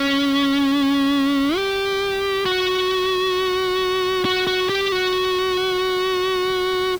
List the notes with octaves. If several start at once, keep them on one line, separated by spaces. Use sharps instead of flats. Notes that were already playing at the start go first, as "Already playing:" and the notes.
Already playing: C#4
G4
F#4
F#4
F#4
G4
F#4